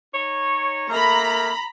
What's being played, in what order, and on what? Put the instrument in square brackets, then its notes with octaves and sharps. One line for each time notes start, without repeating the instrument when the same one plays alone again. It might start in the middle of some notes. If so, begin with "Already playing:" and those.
[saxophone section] D#4 C#5
[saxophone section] A3 A#3 [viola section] A#5 B5